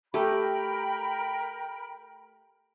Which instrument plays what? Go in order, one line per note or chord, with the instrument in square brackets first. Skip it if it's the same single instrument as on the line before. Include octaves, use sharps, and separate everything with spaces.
[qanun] A3 G4 [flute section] A#4 G5 B5